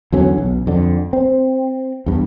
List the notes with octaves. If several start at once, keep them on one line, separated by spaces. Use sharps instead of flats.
E2 D3 F#3 C#4
B1
F2 D3
C4
E2 G2